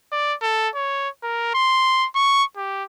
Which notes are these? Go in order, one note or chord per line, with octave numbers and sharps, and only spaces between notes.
D5
A4
C#5
A#4
C6
C#6
G4